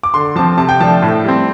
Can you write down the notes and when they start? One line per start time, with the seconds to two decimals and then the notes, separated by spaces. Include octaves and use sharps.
0.03 D6
0.14 D3 C6
0.36 F3 C4 A5
0.58 C3 A5
0.69 G5
0.80 F3 A3 D4 A5
1.02 A2
1.25 G3 C4